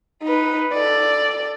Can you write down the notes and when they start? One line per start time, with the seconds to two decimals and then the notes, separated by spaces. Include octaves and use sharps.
0.23 D#4 B4
0.73 A4 D5